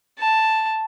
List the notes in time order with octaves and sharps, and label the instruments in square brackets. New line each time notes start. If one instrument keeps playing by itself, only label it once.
[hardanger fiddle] A5